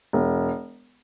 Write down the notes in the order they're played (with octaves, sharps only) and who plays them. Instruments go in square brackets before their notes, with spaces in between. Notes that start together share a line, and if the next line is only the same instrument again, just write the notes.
[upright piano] E1